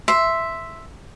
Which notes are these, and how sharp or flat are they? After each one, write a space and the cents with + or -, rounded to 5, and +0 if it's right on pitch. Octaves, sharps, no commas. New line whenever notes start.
E5 +0 C6 +0